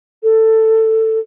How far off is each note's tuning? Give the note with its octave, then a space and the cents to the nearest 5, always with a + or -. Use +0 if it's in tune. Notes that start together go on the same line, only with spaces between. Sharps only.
A4 +15